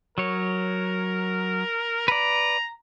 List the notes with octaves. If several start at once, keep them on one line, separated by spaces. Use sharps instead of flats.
F#3 A#4 C#5
B4 D5 A#5